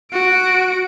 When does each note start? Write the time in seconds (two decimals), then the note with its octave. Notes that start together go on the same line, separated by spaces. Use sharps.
0.12 F#4 D7